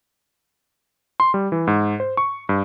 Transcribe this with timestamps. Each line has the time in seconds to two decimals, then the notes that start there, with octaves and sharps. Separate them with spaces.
1.20 C6
1.34 G3
1.52 E3
1.67 G#2
2.00 C5
2.17 C#6
2.49 G2